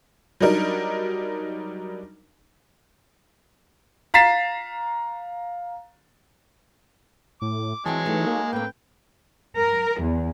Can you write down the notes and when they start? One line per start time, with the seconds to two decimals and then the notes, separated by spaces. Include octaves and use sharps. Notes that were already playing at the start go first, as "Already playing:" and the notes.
0.40 F#3 G3 D4 D#4 A#4
4.14 F5 A#5 A6 B6 C7 E7
7.42 A2 D6
7.86 E3 F#3 G#3 C4 G#4 G5 A5
8.05 G3 A3 D#4
8.27 A#3
8.53 A2 C4 B4 G5
9.56 A#4
10.01 E2